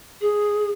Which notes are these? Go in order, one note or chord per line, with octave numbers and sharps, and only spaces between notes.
G#4